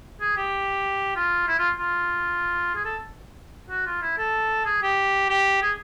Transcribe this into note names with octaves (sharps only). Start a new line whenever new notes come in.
G#4
G4
F4
E4
F4
F4
G#4
A4
F#4
F4
E4
A4
G#4
G4
G4
G#4